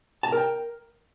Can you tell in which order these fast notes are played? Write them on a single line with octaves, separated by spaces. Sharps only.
A5 A#5 A#4 G5